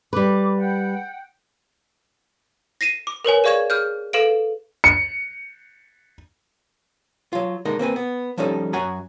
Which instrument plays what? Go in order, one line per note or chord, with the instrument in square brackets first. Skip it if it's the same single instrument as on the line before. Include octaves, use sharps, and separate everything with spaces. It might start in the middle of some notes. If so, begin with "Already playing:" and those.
[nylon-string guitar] G3 B4 [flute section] D6
[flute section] F#5 G5
[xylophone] A#6 C7 D#7 E7
D6
A#4 B4 C#5 G#5
G#4 D5 F5 C#6 G#6 E7
G#4 F6 G6
A4 B4 F5 D7
[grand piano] C#7
[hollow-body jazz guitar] F#3 F4
D3 G#3 D#4 A#4
A#3 C4 B4 G#5
B3
F3 G3 C#4 D#4 A4
F#2 F#4 F#5 G#5 A#5